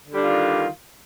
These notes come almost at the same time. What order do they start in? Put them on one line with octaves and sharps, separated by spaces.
D3 G3 D4 F4 D#3